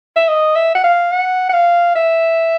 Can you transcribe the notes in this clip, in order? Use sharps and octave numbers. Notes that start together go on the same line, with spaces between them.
E5
D#5
E5
F#5
F5
F#5
F#5
F5
E5